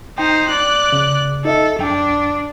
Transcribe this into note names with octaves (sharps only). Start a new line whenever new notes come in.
D#4 C5 G5
D5 F#6
C#3
D#4 A4 D#5 E5
F#2 D4 G5